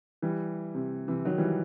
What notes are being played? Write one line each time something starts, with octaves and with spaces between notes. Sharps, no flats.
E3 G3
C3
C3 E3
D#3 F#3
E3 G3